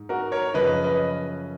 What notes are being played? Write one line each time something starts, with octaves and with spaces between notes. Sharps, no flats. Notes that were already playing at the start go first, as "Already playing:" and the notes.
Already playing: G#2
F#4 A#4
A#4 C#5
F#2 C#3 F3 B4 D#5
B4 D#5